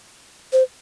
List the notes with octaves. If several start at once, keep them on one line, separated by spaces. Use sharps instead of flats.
C5